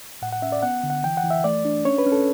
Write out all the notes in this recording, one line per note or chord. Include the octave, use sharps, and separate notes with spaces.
A2 F#5
F#5
C#4 E5
D5
B3 F#5
D3
F#5
E3 G5
F#5
E3
E5
A3 D5
D4
C#4 C#5
B4
C#4
A4